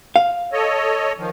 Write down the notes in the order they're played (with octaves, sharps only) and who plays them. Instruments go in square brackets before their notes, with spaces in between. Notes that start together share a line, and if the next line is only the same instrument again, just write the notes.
[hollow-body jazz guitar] F5
[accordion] A4 C#5 D#5
D#3 F3